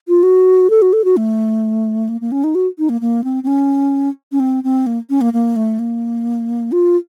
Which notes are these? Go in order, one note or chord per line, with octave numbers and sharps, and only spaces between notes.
F4
F#4
A4
F#4
A4
F#4
A3
A#3
A#3
C#4
D#4
F#4
D#4
A#3
A#3
C4
C4
C#4
C#4
C4
C4
A#3
C#4
A#3
A#3
A3
A#3
F4